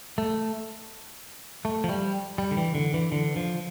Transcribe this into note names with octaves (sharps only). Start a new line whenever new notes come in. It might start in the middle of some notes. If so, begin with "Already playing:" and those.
A3
A3
F3
G3
G3
D3
E3
D3
E3
D3
F3